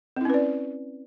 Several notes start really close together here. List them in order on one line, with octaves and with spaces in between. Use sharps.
C4 E4 C#4 B4 D5